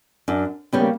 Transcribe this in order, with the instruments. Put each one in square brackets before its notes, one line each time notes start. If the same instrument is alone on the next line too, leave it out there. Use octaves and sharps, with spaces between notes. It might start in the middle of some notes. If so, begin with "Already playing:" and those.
[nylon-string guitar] F#2 [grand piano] D4
[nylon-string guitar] C#3 G3 C#4 G4 [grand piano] B3
[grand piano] A#3